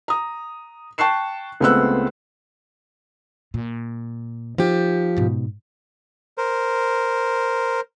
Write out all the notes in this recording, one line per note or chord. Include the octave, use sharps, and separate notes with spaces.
A#5 D#6
G5 A5 C#6 F#6 C7 E7
C#2 A3 B3 C4 E6 F#6
A#2
F3 D#4 G4
G#2 B2
A#4 C5